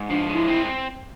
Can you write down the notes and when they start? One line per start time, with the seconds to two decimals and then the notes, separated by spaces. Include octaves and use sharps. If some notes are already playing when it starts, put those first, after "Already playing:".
Already playing: G#2
0.10 F3 D4
0.29 G#3
0.35 E4
0.48 C4